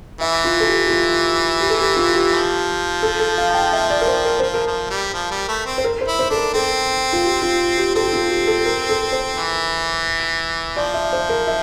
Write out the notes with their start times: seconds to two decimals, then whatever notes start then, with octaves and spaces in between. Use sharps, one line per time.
0.21 E3 E5
0.44 F4
0.60 A4
0.67 G4
0.87 G4
0.90 F4
1.61 G4
1.70 A4
1.79 G4
1.96 F4
2.14 G4
2.31 F3
3.03 A4
3.19 A4
3.38 F5
3.50 A5
3.54 G5
3.73 E5
3.90 D5
4.01 A#4
4.08 C5
4.25 A#4
4.40 F3 C5
4.54 A#4
4.67 F3
4.90 G3
5.14 F3
5.31 G3
5.48 A3
5.66 C4
5.78 C5
5.84 A#4
6.01 C5
6.07 E4
6.19 C5
6.30 D4 A4
6.37 A#4
6.54 C4 A4
7.13 F4
7.25 G4
7.42 F4
7.77 G4
7.95 C4 A4
8.05 G4
8.13 F4
8.31 G4
8.47 A4
8.65 A#4
8.89 A4
9.12 C5
9.36 E3
10.76 F3 D5
10.94 E5
11.13 C5
11.29 A#4
11.47 E5